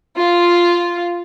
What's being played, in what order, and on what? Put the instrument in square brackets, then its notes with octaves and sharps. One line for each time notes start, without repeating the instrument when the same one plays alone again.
[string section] F4